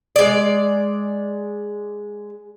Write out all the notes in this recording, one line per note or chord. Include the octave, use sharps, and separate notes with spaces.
G#3 D5